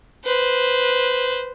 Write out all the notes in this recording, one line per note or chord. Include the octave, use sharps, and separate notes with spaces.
B4 C5